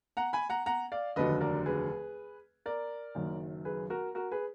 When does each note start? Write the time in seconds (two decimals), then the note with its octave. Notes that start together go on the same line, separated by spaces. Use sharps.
0.17 F#5 A#5
0.33 G#5 B5
0.50 F#5 A#5
0.66 F#5 A#5
0.92 D5 F5
1.16 F1 D#2 D3 F#3 B4 D#5
1.41 A#4 D5
1.66 G#4 B4
2.66 A#4 D5
3.15 F#1 F#2 D#3
3.65 G#4 B4
3.90 F#4 A#4
4.15 F#4 A#4
4.31 G#4 B4